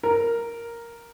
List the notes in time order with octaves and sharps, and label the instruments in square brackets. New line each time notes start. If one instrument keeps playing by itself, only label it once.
[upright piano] A#4